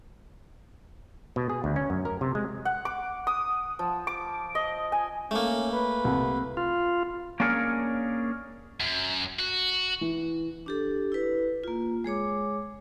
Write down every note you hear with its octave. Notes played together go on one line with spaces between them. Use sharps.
B2
G#4
D2
C#4
F#2
A#4
C3
G#3
F#5
D6
D#6
F3
D6
D#5
G#5
A3 A#3 C#4
B4
C2
F4
A#3 C#4 D4 G#4 A#4 C#5
F#2
F#4
E3
D4 G4 A4
E4 B4
A#3 F4
G#3 G#4 C#5 D6